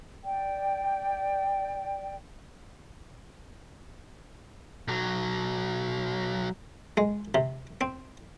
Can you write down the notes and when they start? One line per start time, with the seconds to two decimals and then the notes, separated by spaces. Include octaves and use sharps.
0.24 D5 G5
4.88 B1 F#3
6.97 G#3
7.35 C3
7.81 C4